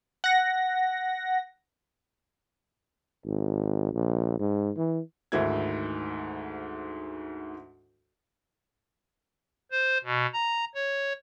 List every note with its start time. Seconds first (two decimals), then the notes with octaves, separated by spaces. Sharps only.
0.24 F#5 A#6
3.25 G#1
3.93 A#1
4.39 G#2
4.77 E3
5.32 D2 G#2 D#3 E4 G#6
9.71 C5
10.04 B2
10.34 A#5
10.75 C#5